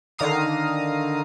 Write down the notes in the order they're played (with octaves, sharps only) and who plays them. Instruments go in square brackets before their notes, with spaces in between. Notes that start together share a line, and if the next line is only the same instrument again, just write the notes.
[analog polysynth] D3 D#3 F5 A#5 D#6 C7